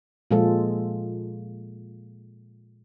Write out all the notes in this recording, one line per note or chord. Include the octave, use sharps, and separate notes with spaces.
A#2 F3 G#3 F4 A4